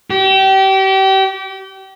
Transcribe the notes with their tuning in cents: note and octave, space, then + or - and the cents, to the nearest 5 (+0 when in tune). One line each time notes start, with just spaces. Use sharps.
G4 -30